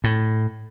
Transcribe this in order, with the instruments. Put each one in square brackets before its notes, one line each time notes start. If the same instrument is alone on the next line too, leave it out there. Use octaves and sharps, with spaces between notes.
[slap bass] A2